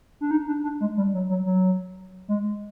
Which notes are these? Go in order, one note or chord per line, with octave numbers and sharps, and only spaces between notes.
D4
D#4
D4
D4
G#3
G3
F#3
F#3
F#3
G#3